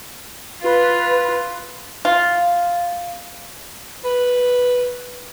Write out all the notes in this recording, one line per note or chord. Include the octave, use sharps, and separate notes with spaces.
F4 B4
F4
B4